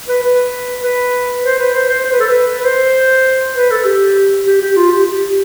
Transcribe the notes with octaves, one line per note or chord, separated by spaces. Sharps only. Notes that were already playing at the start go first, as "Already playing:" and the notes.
B4
B4
B4
C5
B4
C5
C5
C5
B4
A4
B4
B4
C5
B4
A4
G4
G4
G4
F4
G4
G4